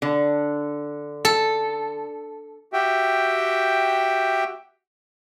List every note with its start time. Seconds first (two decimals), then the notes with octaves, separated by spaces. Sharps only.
0.02 D3
1.25 A4
2.73 F#4 G4 E5 G5